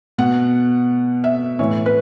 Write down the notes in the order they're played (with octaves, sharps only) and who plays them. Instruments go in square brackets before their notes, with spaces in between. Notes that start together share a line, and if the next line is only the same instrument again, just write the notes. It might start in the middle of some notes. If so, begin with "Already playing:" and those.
[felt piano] B2 F#5
E5
A2 E3 C#5
B4